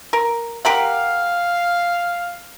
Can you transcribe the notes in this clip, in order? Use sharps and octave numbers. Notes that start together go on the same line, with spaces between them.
A#4
G4 A#4 F5 F#5